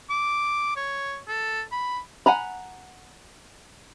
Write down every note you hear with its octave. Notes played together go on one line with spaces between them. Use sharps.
D6
C#5
A4
B5
F#5 G#5 A#5 B5